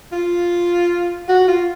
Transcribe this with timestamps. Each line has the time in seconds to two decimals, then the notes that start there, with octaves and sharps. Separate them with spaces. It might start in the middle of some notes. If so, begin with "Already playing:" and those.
0.12 F4
1.29 F#4
1.48 F4